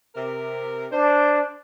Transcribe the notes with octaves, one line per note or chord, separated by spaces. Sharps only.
C3 A#4
D4 C5